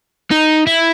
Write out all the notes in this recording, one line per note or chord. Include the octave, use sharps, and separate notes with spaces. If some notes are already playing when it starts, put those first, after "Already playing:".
D#4
E4